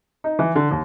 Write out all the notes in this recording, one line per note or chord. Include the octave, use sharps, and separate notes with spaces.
D#4
E3
D3
D#2